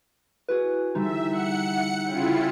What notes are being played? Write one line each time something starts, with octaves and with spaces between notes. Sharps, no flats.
E4 F#4 G#4 B4
D3 E3 G3 D#4 E5
F#5 C#7
C#3 E4 F4 F#5 G5